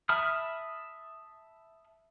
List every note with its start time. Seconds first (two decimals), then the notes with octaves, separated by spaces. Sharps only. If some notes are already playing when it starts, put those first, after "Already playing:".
0.09 E5 A5 B5 D#6 F6